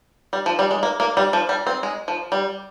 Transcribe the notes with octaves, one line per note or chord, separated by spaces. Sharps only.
G3
F3
G3
G#3
A#3
A#3
G3
F3
G3
C4
G#3
F3
G3